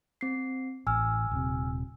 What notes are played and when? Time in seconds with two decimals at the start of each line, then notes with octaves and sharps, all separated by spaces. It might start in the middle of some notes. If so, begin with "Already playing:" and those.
0.21 C4 C7
0.87 A1 G#5 E6 F6
1.31 D#1 C3